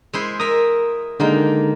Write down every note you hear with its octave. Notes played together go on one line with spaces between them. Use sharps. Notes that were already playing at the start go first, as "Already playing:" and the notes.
G#3 E4 C5
A#4 E5 D#6
D3 D#3 G#3 A#3 D#4 G5